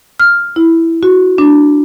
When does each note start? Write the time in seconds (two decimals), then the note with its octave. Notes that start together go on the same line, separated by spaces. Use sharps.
0.20 F6
0.56 E4
1.03 F#4
1.38 D4